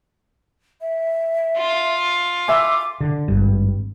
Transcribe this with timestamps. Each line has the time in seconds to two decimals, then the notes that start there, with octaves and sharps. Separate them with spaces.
0.81 E5
1.57 F4
2.48 E5 G#5 D6
3.01 D3
3.28 G#1 G2